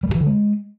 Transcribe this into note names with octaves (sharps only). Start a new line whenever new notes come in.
G3
G2
E3
D3
G#3